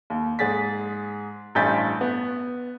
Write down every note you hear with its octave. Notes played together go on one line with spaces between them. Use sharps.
D#2
G#2 G#4 A6 B6
A1 G2 G#5 G6 A6 B6
B3